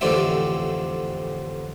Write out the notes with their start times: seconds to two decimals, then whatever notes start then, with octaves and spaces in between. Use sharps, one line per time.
0.01 A1 F2 D3 C4 G4 E5